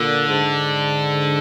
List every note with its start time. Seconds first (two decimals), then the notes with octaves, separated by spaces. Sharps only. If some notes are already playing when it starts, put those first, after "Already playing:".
Already playing: A#2 D3
0.28 G#2